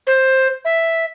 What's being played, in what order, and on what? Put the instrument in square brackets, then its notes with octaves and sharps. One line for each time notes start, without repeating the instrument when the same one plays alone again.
[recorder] C5
E5